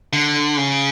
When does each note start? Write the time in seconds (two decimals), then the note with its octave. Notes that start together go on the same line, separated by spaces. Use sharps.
0.13 D3
0.57 C#3